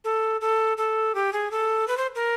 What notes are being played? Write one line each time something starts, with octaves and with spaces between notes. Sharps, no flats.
A4
A4
A4
G4
G#4
A4
B4
C5
A#4